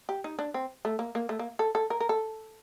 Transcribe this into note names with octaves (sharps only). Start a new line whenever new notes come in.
G4
D#4
D4
C4
A3
A#3
A#3
A3
A#3
A4
A4
A#4
A#4
A4